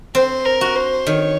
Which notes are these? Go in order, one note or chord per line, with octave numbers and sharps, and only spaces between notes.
C4 C5
A#4
F#4
C5
D#3 C#5